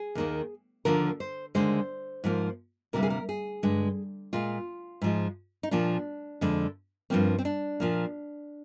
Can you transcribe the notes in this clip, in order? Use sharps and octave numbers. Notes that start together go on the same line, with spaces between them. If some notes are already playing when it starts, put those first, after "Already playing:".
Already playing: G#4
D#2 D#3 A#3
D#2 D3 F3 A#3 A#4
C5
D#2 D3 G#3 C5
G#2 F3 A#3
D2 C3 G3 A#3 A#4
G#4
A#4
G#4
G2 D3 G#3
A#2 G#3 F4
G#2 F3 G#3
D#4
A#2 F3 A#3 D4
F2 D3 G#3
G2 F3 A#3 C4
C4
D4
A#2 F3 A#3